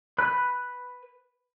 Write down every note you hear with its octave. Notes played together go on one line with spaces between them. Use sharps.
B4 B5 F#6